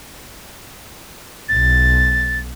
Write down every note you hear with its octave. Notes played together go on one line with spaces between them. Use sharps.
B1 A6